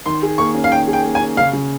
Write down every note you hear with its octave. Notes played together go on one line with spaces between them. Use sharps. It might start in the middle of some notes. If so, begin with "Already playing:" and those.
D#3 C6
G#4
A#3 C#6
C#4
F5
D#3 G5
G#4
G5
A#3
G#5
C#4
C#3 F5
C#3